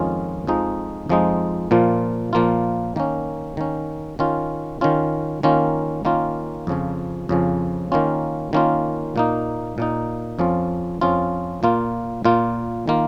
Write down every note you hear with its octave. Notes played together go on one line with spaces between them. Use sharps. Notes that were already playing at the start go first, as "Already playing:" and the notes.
Already playing: F2 D#3 G#3 C#4 F4
F2 F3 G#3 D#4
F2 F3 G#3 D#4
A#2 F3 A#3 F4
A#2 F3 A#3 F4
D#3 A#3 C#4
D#3 A#3 C#4
D#3 C#4 F4
D#3 C#4 F4
D#3 A#3 C#4 F4
D#3 A#3 C#4 F4
F2 C#3 F3 C#4
F2 C#3 F3 C#4
D#3 A#3 C#4 F4
D#3 A#3 C#4 F4
A#2 A#3 D#4
A#2 A#3 D#4
F2 F3 C#4 F4
F2 F3 C#4 F4
A#2 A#3 F4
A#2 A#3 F4
D#3 A#3 F4